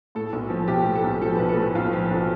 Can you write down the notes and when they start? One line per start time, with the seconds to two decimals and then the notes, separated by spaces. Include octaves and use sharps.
0.15 A2 A4
0.33 B1
0.50 F3
0.68 B1 G4
0.86 A2
0.95 A4
1.03 B1
1.21 F3 A4
1.35 B1 B4
1.49 A4
1.57 A2
1.75 B1 F4
1.93 F3
2.10 B1